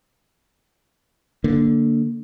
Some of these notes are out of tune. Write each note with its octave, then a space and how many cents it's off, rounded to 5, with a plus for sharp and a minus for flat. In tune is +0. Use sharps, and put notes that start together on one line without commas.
D3 +0 A#3 +0